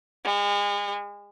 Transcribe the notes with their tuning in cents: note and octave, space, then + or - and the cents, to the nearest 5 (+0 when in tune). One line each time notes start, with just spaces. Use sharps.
G#3 -40